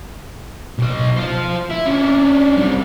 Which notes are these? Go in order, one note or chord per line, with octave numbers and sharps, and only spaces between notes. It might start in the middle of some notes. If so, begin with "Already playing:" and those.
B1 D#5
F4 C5
E4
C#4 D4
C3 G3